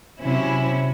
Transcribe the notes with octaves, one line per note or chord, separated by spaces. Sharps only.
C3 F#3 C#4 E4